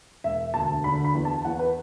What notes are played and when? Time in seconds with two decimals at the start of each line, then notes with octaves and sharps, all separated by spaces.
0.24 E1 E5
0.54 D2 A5
0.84 D3 B5
1.04 B5
1.15 E2
1.25 A5
1.45 E2 F#5
1.59 B4